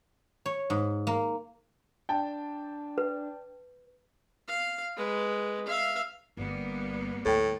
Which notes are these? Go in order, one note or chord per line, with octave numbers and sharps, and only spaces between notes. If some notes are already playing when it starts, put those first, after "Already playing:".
C#5
G#2
A#3
D4 G5 A5
B4
F5
G#3 B4
E5 F5
G1 G3 A#3 B3
D2 A2 A4 G5